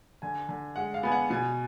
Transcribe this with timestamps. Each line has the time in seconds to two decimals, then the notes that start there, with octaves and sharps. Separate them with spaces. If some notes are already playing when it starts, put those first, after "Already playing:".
0.22 D3 G#5
0.49 D3
0.76 G#3 F#5
0.94 F5
1.03 B3 G#5
1.12 F#5
1.30 B2 G#5